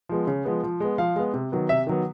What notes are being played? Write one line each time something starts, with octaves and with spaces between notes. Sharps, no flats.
F3 G#3 B3
C#3
F3 G#3 B3
F3
G#3 B3
F3 F5
G#3 B3
C3
D#3 F#3 B3
C3 E5
D#3 F#3 B3